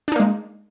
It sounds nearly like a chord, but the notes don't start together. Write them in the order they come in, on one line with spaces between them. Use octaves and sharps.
D4 D#4 A#3 G#3